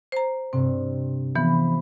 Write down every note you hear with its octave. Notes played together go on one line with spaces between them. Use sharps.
C5 A#5
G2 C3 C4
E3 F3 B3 B5